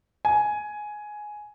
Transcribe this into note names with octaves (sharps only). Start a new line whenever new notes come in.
G#5